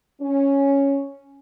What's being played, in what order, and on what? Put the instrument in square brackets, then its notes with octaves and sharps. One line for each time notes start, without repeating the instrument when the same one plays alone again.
[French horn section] C#4